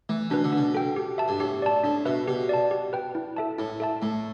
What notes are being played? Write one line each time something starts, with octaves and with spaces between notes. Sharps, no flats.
E3 A3
B2 D4 B4
D3
B2 D4
A4 G5
G4
E5 A5
G2
A2 G4
D5 A5
A2 D4
B2 B4 E5
B2 G4
D5 A5
G4
B4 G5
E4
A4 E5 A5
A2 E4
A4 E5 A5
A2 A3